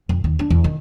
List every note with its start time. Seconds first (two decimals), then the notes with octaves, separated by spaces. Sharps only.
0.09 F2
0.24 D#2
0.39 D4
0.50 E2
0.64 D#3